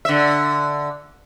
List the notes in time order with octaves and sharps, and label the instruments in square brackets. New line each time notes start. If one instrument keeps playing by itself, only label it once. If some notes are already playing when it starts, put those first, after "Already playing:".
[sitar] D3 E5